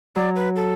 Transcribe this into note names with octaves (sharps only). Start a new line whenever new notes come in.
F#3 D5
B4
A4